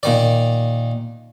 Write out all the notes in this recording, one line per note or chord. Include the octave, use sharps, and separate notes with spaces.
A#2 D#3 D5